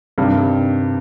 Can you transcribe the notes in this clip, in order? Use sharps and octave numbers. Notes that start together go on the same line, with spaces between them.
G2 C3 D#3 G3